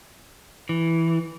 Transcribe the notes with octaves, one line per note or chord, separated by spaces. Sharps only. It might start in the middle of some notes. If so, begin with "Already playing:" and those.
E3